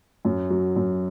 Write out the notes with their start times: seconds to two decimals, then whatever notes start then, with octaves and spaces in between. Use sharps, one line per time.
0.25 F#2
0.50 F#3
0.76 F#2